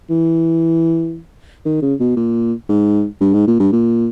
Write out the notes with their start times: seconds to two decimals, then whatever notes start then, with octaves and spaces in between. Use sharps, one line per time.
0.10 E3
1.65 D#3
1.82 C#3
2.00 B2
2.16 A#2
2.69 G#2
3.21 G2
3.33 G#2
3.47 A#2
3.60 G2
3.72 A#2